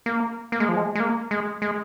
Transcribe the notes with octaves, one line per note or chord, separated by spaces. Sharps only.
A#3
A#3
G#3
F3
G#3
G#3
A#3
G#3
G#3